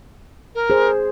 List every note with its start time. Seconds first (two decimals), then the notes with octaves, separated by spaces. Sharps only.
0.55 A#4
0.70 G#4 C5